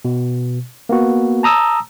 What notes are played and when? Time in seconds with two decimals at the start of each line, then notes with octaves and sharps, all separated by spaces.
0.05 B2
0.89 A#3 B3 F#4
1.43 A5 A#5 D#6 E6